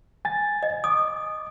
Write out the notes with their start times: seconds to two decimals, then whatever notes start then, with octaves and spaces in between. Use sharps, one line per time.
0.25 G#5 A6
0.63 D#5
0.84 D6 D#6